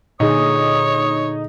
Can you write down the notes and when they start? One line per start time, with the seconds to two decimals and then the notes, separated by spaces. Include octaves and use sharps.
0.20 A#2 D3 D#4 G#4 C#5 D#6